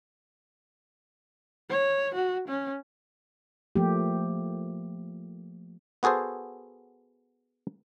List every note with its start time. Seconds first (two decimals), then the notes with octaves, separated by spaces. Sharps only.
1.70 C#5
2.15 F#4
2.48 C#4
3.76 F3 A3 A#3 G4
6.03 B3 F#4 G#4 A4 C5